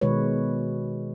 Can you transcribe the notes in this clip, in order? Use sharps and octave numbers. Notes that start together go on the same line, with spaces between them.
B2 D#3 G#3 B4 C#5